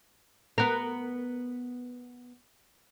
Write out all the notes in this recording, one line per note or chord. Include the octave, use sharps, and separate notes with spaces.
B3 A#4